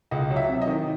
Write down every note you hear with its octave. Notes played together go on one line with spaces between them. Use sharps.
C#2 D#5
F#3
E5
C3
D#5
D#3